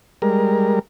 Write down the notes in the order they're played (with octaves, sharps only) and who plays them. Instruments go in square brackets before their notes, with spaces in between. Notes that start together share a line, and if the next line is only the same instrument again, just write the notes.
[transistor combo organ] G3 G#3 A#4